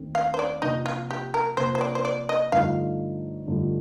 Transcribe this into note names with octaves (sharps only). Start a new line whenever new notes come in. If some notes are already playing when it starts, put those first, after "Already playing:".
Already playing: D#2 D#3 A3 C4
F5
C5
D5
C3 F3 A#3 D#4
F4
G4
A#4
C3 F3 A#3 C5
C5
D5
C5
D5
D#5
G2 D3 F3 A3 D#4 F5
G2 D3 F3 A3 D#4